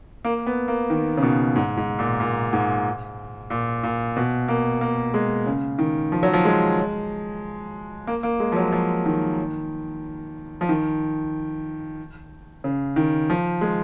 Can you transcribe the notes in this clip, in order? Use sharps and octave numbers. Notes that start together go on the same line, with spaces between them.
A#3
B3
A#3
D#3
C#3
B2
G#2
G#2
A#2
A#2
G#2
A#2
A#2
B2
A#3
A#3
G#3
C#3
D#3
F3
F#3
F3
G#3
A#3
A#3
G#3
F3
F#3
F3
D#3
F3
D#3
C#3
D#3
F3
G#3